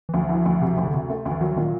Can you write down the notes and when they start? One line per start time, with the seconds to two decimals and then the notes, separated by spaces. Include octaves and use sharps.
0.09 E3
0.14 D2 F3
0.24 F3
0.29 E3
0.35 F3
0.46 D2
0.62 C3
0.77 D2 F3
0.84 C#3
0.88 D3
0.94 C3
1.10 A3
1.25 D2
1.31 E3
1.41 D#3 F#3
1.57 A#2 D#3